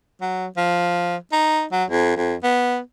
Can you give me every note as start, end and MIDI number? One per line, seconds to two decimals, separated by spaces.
0.21 0.46 54
0.57 1.16 53
1.32 1.65 63
1.72 1.84 54
1.90 2.15 41
2.17 2.35 41
2.44 2.79 59